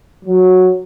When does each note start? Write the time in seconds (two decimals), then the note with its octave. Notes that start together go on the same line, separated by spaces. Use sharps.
0.25 F#3